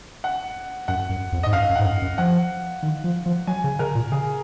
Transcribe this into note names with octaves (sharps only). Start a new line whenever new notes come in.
F#5
F#2 F#5
F#2
F2
G#2 D#5
F#2 F5
F#2
G#2 F#5
F#2
F#2
F3 F#5
D#3
F3
F3
F#3 G#5
C#3
C#3 A#4
A#2
C#3 G#4